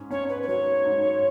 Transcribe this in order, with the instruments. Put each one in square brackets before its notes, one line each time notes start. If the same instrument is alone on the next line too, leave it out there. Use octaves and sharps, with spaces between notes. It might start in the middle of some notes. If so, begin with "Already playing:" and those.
Already playing: [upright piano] G#2 C#4
[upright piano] C#4 [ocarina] C#5
[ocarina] B4
B4
[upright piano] F#3 [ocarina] C#5
[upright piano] G#2